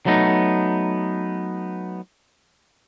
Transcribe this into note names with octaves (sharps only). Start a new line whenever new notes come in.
F#3 A3 B3 D#4